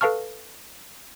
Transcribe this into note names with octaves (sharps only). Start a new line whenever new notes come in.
A4 B4 F5 A5 C#6 F6